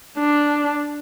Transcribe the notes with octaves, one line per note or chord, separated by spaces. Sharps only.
D4